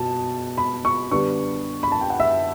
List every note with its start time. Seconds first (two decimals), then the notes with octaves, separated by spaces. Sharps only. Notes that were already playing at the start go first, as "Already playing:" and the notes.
Already playing: B2 A5
0.57 B5
0.85 C#6
1.11 D3 G3 B3 D4 C#6
1.83 B5
1.92 A5
2.01 G5
2.10 F#5
2.20 E5